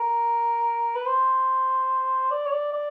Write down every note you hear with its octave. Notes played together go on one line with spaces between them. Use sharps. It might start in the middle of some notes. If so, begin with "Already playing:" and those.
Already playing: A#4
B4
C5
D5
C#5
D5
D5